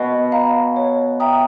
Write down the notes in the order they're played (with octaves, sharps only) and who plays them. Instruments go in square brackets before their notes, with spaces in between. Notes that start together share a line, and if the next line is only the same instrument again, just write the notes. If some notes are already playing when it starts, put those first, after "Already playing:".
Already playing: [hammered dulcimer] B2
[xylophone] F5 A#5
C#5
E5 G5 A#5 D#6